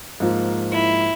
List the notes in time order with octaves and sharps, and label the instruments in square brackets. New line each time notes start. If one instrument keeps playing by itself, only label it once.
[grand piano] G#2 F3 A#3
[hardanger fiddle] E4